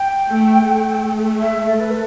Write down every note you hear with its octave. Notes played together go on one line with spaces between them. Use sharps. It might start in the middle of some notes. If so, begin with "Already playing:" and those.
Already playing: G5
A3
A3
E5
A4
B4
A4